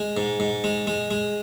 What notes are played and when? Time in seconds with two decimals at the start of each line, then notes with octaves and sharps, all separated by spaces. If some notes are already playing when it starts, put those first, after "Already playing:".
Already playing: G#3
0.17 G#2
0.40 G#2
0.64 G#3
0.87 G#3
1.11 G#3